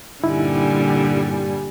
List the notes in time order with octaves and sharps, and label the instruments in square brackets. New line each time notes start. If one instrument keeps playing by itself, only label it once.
[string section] G2 G3 G#5 [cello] A#2 D3 [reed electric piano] D#4 E4